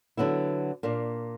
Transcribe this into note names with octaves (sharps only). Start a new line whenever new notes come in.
D3 F#3 B3 E4
A#2 A#3 D4